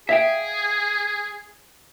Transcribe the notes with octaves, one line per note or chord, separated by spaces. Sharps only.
G#4 E5 F5 G5